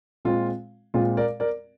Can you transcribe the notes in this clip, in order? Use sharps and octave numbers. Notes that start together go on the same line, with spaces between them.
A#2 G#3 C4 F4
A#2 G#3 C4 F4
A#4 D5
A#4 D5